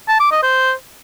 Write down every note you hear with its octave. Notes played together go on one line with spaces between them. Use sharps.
A5
D6
D#5
C5